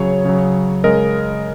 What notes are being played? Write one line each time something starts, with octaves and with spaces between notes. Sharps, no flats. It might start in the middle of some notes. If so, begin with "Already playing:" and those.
Already playing: C#3 F#3 G#4 C#5
C#3 F#3
C#3 G#3 A#4 D#5